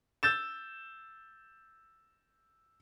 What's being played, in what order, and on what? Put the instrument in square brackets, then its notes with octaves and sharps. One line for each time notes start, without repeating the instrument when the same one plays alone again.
[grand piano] E6 G6 A6 E7